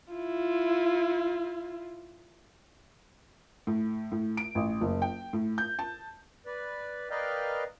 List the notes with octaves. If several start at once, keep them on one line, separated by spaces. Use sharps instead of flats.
E4 F4
A2
A2
D7
A1
F#1
G5
A2
G6
A5
B4 D5
A#4 B4 D5 D#5 F5 G5